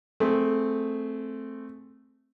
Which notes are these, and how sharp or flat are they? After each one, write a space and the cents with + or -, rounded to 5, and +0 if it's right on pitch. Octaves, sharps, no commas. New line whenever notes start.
A3 +0 C4 +0 G#4 +15